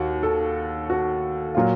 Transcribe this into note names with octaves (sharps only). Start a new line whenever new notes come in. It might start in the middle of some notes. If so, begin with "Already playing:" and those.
Already playing: D#2 F#4
A4
F#4
A#2 F#3 F4